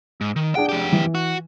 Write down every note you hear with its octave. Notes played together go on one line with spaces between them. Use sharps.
G#2
D#3
D4 G#4 F#5 G5
F2 G4
E3
F#4